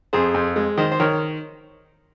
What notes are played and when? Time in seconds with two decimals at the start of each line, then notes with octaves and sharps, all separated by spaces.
0.13 F2 G#4 C5
0.34 F2
0.56 G#3
0.78 D#3 C5 D#5
0.92 C5
1.00 D#3 A#4 C#5